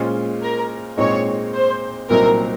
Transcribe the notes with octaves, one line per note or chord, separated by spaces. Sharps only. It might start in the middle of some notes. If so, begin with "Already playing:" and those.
Already playing: A#2 G#3 C#4 F4 C5
A#4
A#2 G#3 C4 D#4 C#5
C5
C2 A#2 F#3 C4 D#4 A#4